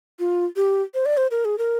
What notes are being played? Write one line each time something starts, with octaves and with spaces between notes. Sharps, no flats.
F4
G4
C5
D5
C5
A#4
G#4
A#4